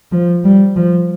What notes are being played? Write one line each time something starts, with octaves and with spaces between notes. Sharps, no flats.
F3
G3
F3